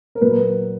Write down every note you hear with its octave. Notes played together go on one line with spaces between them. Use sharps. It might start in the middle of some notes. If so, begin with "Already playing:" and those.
A#4
A#2 F#3 A#3 B4